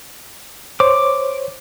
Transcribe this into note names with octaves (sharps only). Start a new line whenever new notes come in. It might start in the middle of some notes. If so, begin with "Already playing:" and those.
C5 C#5 D6